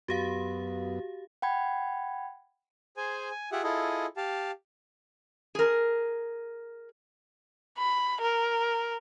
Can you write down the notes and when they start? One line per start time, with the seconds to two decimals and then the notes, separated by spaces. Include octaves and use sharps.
0.08 F#2 B3 F#4 G4 F5
1.42 F#5 G5 B5 G#6
2.97 G#4 C5 G#5
3.31 G#5
3.52 F4 G4 G#4 E5 F#5
3.64 E4 F4 G#4 A4 D#5
4.17 G4 F5 A5
5.55 G#4 A#4
7.78 B5
8.21 A#4